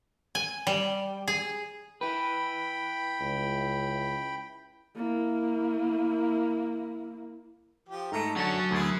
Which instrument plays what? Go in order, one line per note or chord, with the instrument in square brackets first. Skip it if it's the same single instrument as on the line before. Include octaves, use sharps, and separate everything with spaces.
[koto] G#5
G3
G#4
[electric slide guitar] E4 B4 [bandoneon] G5 B5
[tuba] C#2
[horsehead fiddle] A#3 E4
[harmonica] F3 G4
[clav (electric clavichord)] G#2 A3 [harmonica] A4 A#5
[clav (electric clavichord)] D3 A5 [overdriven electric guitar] F#3 C#4 [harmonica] F#4
[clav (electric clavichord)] D2 [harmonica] E4 G#4